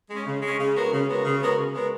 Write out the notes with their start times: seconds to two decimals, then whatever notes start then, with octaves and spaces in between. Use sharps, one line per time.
0.09 G#3 C#4
0.26 C#3
0.42 G#3 C#4
0.59 C#3
0.75 G#3 B3 F#4 A#4
0.92 C#3
1.08 G#3 B3 F#4 A#4
1.25 C#3
1.41 G#3 B3 F#4 A#4
1.58 C#3
1.75 G#3 B3 F#4 A#4